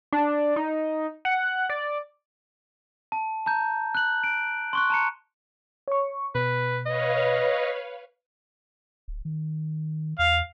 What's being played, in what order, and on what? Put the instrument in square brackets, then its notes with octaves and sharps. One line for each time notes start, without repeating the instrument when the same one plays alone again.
[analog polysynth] D4
D#4
F#5
D5
[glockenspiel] A5
A5 A#5 G6
F#6 F#7
D7
C6 C#6 F#6
A5 A#5 C#7
[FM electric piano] C#5 C#6
[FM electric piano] B2 [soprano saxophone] B4
[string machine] B4 C#5 F5 [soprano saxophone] D#5
[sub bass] D1
D#3
[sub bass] E2 [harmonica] F5